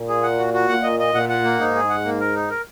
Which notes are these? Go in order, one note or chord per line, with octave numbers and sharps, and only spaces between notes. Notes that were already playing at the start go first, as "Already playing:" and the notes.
Already playing: A#2
G#4
F#5
F#4
F#4
A#2 F#5
D#5
D#5
A#2 F#5
F#5
A#3
G#2 D#4
G#4
F#5
A#3
A#4
D#4
A#4